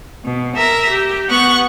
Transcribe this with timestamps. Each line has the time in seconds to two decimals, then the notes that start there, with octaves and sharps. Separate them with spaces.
0.24 B2
0.55 A#4 E5 A#5
0.89 G4
1.29 B3 F#5 C#6 F#6